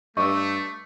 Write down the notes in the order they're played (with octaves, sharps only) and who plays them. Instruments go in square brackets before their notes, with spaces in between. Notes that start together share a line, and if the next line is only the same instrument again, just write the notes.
[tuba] G2 [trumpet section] A3 [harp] D#5 D6 E6 [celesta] C#6